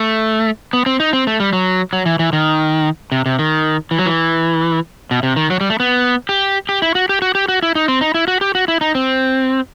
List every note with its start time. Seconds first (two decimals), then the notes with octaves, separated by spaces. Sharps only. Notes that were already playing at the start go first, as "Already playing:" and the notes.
Already playing: A3
0.73 B3
0.86 C4
1.00 D#4
1.13 C4
1.27 A3
1.40 G3
1.53 F#3
1.93 F#3
2.06 E3
2.19 E3
2.33 D#3
3.12 C3
3.26 C3
3.39 D#3
3.91 E3
3.99 F#3
4.06 E3
5.11 B2
5.23 C3
5.36 D#3
5.50 F#3
5.61 G3
5.70 A3
5.80 B3
6.29 G4
6.69 G4
6.82 E4
6.95 F#4
7.09 G4
7.22 F#4
7.35 G4
7.48 F#4
7.62 E4
7.75 D#4
7.88 C4
8.01 D#4
8.14 E4
8.28 F#4
8.41 G4
8.55 F#4
8.68 E4
8.81 D#4
8.95 C4